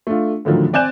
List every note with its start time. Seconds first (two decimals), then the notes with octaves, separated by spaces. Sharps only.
0.07 A3 D4 F4
0.45 A2 D3 D#3 F3 F#3
0.73 C4 D5 G#5 F#6 G6 E7